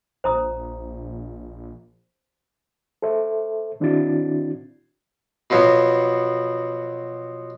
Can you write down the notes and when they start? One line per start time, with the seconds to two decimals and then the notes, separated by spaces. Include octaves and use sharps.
0.24 A#1 C5 A#5 D#6
3.02 A4 C5 E5
3.80 D#3 C4 D4 E4 F#4 A6
5.50 B2 F3 F#3 B3